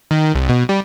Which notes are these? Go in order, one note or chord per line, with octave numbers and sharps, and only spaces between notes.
D#3
C2
B2
G3